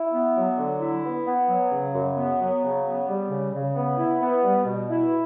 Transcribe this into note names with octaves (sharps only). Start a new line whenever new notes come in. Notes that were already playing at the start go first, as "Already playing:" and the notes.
Already playing: E4
B3
F#3
D3
E4
B3
B3
F#3
C#3
F#2
B3
F#3
C#3
B3
G3
C#3
C#3
B3
E4
B3
G3
B2
E4